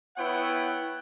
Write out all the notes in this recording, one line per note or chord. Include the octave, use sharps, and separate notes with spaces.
B3 E4 B4 C#5 F#5 G5